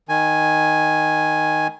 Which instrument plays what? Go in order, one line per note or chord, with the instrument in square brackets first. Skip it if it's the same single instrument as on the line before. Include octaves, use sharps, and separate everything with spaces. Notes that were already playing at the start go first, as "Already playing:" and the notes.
[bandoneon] D#3 G#5